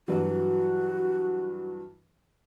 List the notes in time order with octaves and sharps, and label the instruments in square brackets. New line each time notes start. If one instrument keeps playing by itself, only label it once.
[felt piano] G2 E3 F#3 [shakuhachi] F#4